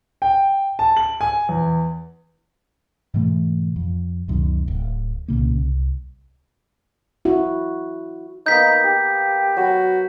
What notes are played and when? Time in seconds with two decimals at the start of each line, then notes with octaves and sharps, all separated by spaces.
0.22 G5
0.79 A5
0.97 F#7
1.21 G#5
1.49 E2
3.14 G#2 B2 E3 A3
3.76 F2
4.28 C#2 F#2 B2 D#3
4.68 D1
5.28 C2 A#2 C#3 A#3
5.55 C2
7.25 E4 F#4
8.46 A#3 B3 D#4 A#5 G6 B6
8.84 G4
9.57 F#3 F#4 B5